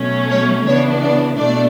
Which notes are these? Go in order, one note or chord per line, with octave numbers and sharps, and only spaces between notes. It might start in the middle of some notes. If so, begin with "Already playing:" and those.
Already playing: B2 F#3 A3 C#4
C#5
C#3 E3 B3 D4 C#5
D5
B2 A3 D4 D5